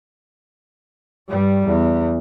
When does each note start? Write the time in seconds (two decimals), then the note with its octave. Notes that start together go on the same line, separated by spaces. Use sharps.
1.27 G2 G3
1.66 E2